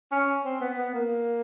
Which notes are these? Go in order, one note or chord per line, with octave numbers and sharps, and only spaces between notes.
C#4
C4
B3
B3
A#3